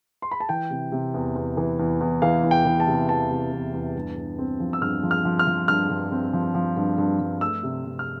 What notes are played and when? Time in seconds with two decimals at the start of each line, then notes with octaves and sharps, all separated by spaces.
0.22 C6
0.31 B5
0.40 A5
0.49 E3 G5
0.70 C3
0.92 C3
1.14 E2
1.35 E2
1.57 E3
1.79 E2
2.00 E2
2.22 E3 F5
2.43 E2
2.51 G5
2.65 E3
2.80 A5
2.87 C3
3.09 E2 A5
3.30 C3
3.52 E2
3.73 E2
3.95 G2
4.17 G2
4.38 C4
4.60 F3
4.73 E6
4.82 G2 F6
5.03 F3
5.11 F6
5.25 F3
5.39 F6
5.47 F3
5.68 G2 F6
5.90 G2
6.12 C4
6.33 F3
6.55 F3
6.77 G2
6.98 G2
7.20 G2
7.41 A3 E6
7.63 C3
7.85 C3
7.99 F6